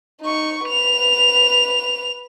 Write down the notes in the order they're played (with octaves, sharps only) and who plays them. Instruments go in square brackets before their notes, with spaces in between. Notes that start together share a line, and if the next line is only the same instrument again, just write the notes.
[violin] D#4 C#6
B4 F7